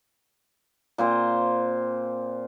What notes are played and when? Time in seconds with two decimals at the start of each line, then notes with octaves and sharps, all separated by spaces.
0.98 A#2 C4 C5